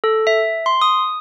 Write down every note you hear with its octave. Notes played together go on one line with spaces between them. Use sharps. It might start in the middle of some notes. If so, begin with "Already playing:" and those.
A4
E5
C6
D#6